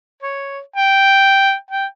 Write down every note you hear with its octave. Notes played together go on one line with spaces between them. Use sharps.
C#5
G5
G5